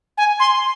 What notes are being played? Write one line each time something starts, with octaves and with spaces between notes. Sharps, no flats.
G#5
C6